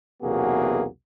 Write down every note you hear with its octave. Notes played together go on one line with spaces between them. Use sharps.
B1 E2 C3 A#3 F#4 G#4